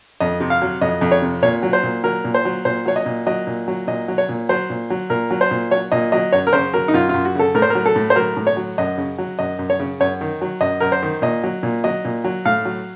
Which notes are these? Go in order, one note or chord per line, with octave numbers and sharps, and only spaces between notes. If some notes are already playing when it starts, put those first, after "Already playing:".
F2 D#5
C3
F5
F#3
F2 D#5
F2
C#5
C3
A#2 C#5
F#3
C5
A#2
F#3 A#4
A#2
C5
F#3
A#2 C5
F#3 C#5
D#5
A#2
F#3 D#5
A#2
F#3
A#2 D#5
F#3
C#5
A#2
F#3 C5
A#2
F#3
A#2 A#4
F#3
C5
A#2
F#3 C#5
A#2 D#5
F#3 D#5
F#2 C#5
A#4
C#3 C5
F#3 A#4
D#4
F#2 F4
F#2 F4
F#4
C#3 A4
A2 A#4
C5
F#3 A#4
A4
A2
C5
F#3 A#4
A2
C#5
F#3
F#2 D#5
C#3
F#3
F#2 D#5
F#2
C#5
C#3
F#2 C#5
D#3
F#3
F#2 D#5
F#2 A#4
C5
D#3
A#2 D#5
F#3
A#2
F#3 D#5
A#2
F#3
A2 F5
F#3